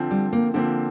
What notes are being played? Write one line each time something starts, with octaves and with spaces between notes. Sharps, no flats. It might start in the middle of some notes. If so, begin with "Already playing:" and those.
Already playing: D3 F3 C4
G3
A#3
D3 F3 A#3 C4